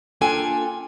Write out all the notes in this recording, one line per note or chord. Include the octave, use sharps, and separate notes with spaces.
A#3 D4 F4 A4 G5 G#5